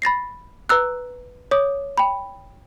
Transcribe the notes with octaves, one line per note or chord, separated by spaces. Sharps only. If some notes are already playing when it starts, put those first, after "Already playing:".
B5 A6 A#6 C7
B4 A#5 E6 F#6
C#5 D6 D#6
G5 B5